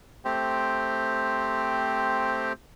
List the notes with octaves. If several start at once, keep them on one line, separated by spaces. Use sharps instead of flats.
A3 C4 G4 C5